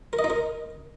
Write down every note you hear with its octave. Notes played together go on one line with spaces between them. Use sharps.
A#4
D#5
D#4
A#4